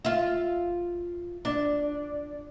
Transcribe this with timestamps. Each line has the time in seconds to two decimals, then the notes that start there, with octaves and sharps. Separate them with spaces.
0.05 F4 E5
1.45 D4